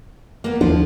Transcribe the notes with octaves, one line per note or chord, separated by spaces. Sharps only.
A#3 B3
D#2 F3 D4